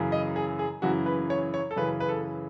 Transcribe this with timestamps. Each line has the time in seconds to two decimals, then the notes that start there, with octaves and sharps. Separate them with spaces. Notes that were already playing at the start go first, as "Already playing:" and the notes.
Already playing: F#2 C#3 E3
0.12 D#5
0.36 G#4
0.59 G#4
0.82 F#2 C#3 E3 F#4
1.06 B4
1.30 C#5
1.54 C#5
1.71 A4
1.76 F#2 C#3 E3 B4
2.00 B4
2.09 A4